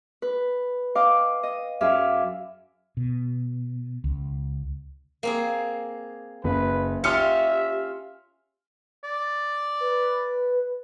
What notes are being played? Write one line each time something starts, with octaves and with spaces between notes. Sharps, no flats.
B4
D#5 F5 G5 D6
D#5
F#2 G#4 E5 F5 D6
B2
C#2
A#3 C4 G#4
F#1 B4
C#4 F4 G4 E5 C6 F6 C#7
D5
B4